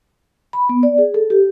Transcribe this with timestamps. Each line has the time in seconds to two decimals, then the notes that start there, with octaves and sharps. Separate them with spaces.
0.53 B5
0.69 B3
0.83 D5
0.98 G#4
1.14 A4
1.30 G4